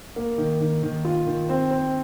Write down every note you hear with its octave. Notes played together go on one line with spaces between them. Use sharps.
A#3
D#3
D#3
D#3
F4
D#3
C4
C4